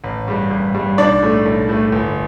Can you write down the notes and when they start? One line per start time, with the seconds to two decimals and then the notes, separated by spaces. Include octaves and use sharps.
0.04 A1
0.28 G2 G3
0.50 A1
0.74 G2 G3
0.98 B1 D4 D5
1.22 A2 A3
1.46 B1
1.69 A2 A3
1.92 G1